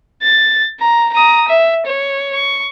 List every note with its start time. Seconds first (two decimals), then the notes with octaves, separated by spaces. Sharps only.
0.22 A6
0.80 A#5
1.13 A#5 D#6
1.48 E5
1.86 C#5
2.33 C#6